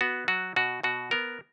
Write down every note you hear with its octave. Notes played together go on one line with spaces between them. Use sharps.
B3 F#4
F#3 F#4
B2 F#4
B2 F#4
B3 A#4